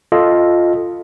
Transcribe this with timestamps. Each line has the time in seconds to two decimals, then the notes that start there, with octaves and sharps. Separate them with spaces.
0.12 F4 A4 D#5